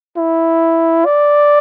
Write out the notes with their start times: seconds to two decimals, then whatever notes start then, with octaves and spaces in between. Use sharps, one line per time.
0.17 E4
1.05 D5